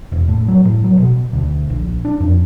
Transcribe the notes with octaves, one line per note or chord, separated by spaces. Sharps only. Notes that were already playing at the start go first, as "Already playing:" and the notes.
E1
A2
F#3
A2
F#3
B2
D2
A#1
D4
F2